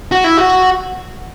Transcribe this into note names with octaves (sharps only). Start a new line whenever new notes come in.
F#4
E4
F#4